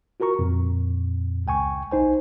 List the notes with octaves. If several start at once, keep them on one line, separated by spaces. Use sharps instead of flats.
F4 F#4 A#4 A#5 C#6
F2 A#2
C#2 G5 G#5 C#6
B1 D#4 C5 G#5